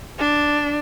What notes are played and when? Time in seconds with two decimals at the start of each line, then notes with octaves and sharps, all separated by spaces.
0.19 D4